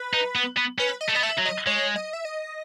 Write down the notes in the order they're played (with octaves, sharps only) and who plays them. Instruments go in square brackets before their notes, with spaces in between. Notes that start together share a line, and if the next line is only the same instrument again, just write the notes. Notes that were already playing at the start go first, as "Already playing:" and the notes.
Already playing: [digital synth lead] B4
[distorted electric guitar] D#4
B3
B3
[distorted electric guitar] C#4 [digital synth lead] B4
[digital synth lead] D#5
[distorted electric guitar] A3
[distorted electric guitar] B3 [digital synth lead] D#5
[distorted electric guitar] A3 [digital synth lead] E5
[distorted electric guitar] F#3
[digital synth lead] D#5
[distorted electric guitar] G#3 [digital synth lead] C#5
[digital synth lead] D#5
E5
D#5